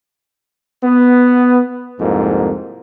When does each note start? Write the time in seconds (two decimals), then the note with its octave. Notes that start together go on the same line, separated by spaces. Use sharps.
0.83 B3
1.99 C2 F2 G#2 A#3